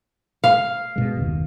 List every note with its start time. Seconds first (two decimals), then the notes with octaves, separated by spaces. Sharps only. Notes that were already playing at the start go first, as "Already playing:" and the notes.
0.44 F5
0.96 B2 G#3
1.15 F#1 D#2 B2